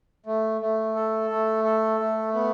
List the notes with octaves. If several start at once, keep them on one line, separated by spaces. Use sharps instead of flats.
A3
A3
A4
A3
A4
A3
B3